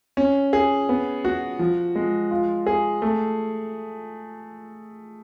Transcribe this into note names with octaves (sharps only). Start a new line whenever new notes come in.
C#4
G#4
B3
F#4
F3
G#3
F4
G#4
A3